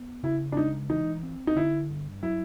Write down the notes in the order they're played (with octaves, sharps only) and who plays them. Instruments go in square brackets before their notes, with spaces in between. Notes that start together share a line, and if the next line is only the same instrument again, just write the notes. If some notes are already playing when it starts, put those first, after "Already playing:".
Already playing: [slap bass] B3
[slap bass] C#3 [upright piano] E4
[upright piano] D4
[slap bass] G#3 [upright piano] D#4
[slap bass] E3 [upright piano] D#4
[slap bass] C4
[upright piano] D#4
[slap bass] D3 [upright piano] E4
[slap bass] G2
[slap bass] F#3 [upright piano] E4